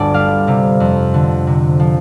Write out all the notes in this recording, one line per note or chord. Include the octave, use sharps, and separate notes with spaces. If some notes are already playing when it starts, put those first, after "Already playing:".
Already playing: G1 D2 A4 D5
G3 F5
C3
F2
D3
C3
F3